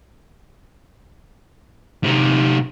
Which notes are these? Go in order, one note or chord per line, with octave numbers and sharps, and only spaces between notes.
C3 D#4